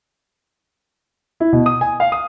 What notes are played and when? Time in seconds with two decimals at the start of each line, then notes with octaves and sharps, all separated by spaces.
1.40 E4
1.53 B2
1.66 D#6
1.81 G#5
2.00 F5
2.12 D#6